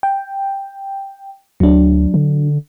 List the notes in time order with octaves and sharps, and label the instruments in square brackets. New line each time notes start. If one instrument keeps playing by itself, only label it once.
[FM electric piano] G5
[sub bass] D2 [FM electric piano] F#3 D4
[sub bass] D3